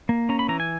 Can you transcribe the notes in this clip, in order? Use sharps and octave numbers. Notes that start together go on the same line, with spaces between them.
A#3
C#4 A#5
B5
E3 A#5
G#5